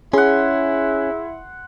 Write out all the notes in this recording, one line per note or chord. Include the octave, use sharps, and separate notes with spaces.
C#4 E4 G#4 F#5 C6